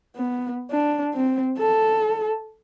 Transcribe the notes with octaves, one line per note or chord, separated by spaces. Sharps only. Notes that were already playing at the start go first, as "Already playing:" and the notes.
B3
D4
C4
A4